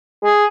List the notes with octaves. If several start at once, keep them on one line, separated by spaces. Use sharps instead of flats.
G#4